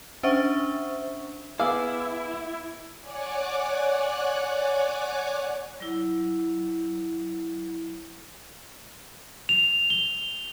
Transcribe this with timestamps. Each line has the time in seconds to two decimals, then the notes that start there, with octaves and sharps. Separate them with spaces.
0.23 C#4 D4 C5 E5 C#6
1.60 B3 E4 G#4 F5 D6 E6
3.00 C#5 D5 F#5 G#5 D6 F#6
5.80 F#3 E4
9.49 F7
9.90 G7